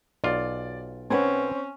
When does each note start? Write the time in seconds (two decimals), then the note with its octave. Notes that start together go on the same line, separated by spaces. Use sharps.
0.24 B1 F4 D5
1.10 C4 C#4 B4 F#5 G#5